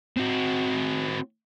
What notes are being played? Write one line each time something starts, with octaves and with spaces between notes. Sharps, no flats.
C4 F#4